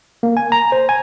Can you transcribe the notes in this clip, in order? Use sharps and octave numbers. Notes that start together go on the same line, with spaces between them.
A#3
G#5
A#5
C5
G#5